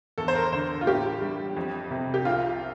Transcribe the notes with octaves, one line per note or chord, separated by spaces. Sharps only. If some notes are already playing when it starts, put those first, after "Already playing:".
E2 A4
C5
A#4
D3 C5
F4
A2 G4
G3
F2
C3
G4
C2 F4